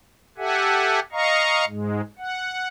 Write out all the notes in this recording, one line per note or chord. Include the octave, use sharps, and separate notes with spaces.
G4 A4 E5 F#5 G#5
D#5 F5 A#5 C#6
G#2 G#3
F#5